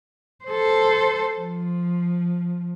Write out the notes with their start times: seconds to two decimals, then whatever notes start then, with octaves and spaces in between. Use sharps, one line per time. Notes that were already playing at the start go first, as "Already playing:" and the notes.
0.45 A4 C5
1.38 F3